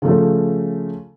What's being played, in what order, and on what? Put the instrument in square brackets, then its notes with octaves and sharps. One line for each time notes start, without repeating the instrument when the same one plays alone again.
[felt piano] C#3 F3 A3 A4